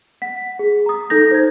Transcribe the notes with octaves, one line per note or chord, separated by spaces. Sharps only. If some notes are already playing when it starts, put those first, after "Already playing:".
F#5 B6
G#4
A#5 D#6
D#4 A4 G6 A#6
C5 G#6